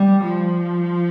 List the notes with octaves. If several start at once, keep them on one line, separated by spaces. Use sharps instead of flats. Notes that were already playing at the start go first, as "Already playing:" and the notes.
Already playing: G3
F3